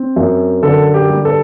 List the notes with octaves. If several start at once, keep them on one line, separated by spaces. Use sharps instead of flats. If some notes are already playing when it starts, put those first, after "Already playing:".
Already playing: C4
F#2
D3 A4
G4
G3
A4